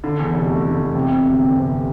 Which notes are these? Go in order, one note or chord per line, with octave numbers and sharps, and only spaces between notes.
D3
E2
F1
A3
D3
E2
C3
F2
G1
G1
C3